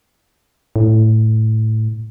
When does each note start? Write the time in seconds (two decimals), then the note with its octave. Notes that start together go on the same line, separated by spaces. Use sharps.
0.76 A2